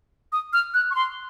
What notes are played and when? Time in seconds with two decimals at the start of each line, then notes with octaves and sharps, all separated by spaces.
0.32 D#6
0.53 F6
0.74 F#6
0.91 C#6
0.95 C6